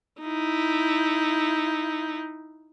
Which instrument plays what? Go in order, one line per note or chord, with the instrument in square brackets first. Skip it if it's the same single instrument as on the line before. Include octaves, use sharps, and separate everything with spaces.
[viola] D#4 E4